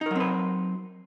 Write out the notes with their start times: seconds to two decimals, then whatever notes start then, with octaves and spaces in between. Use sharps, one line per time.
0.01 D#4
0.06 A#4
0.11 F#3
0.15 C4
0.20 B4